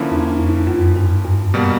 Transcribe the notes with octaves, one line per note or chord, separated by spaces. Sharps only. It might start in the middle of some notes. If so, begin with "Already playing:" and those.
Already playing: D3 F3 A#3 C#4 E4
E2
F2
F#2
G2
G2
B2 G3 A#3